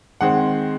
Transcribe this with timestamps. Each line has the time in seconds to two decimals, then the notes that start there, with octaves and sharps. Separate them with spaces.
0.21 D#3 G#3 C4 F#5